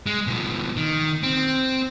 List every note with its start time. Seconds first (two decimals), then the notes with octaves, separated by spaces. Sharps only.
0.06 G#3
0.27 B2 F3
0.77 D#3
1.23 C4